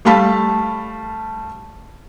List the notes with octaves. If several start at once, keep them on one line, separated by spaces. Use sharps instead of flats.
G3 A3 F5 A5 B5 B6